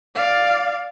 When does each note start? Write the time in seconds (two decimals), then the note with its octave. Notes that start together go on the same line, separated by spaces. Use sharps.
0.15 D5 F5